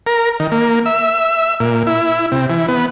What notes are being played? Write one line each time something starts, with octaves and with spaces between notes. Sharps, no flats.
A#4
D#3
A#3
E5
A#2
E4
C3
E3
B3